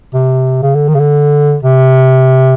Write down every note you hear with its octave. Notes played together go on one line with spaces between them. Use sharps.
C3
C#3
D3
D#3
C#3
D3
C3